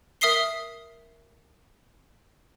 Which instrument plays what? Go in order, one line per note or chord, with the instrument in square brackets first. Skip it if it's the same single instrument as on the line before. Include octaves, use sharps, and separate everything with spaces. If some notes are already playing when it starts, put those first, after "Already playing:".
[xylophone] A#4 E5 D#6 B6 C7 G7